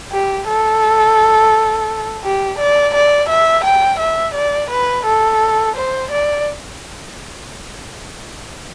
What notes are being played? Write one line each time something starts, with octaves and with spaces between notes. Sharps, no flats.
G4
A4
G4
D5
D5
E5
G5
E5
D5
B4
A4
C5
D5